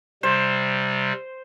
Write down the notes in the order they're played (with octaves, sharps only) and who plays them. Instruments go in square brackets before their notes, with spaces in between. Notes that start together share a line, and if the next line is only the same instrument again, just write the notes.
[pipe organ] C3 G3 [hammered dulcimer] C5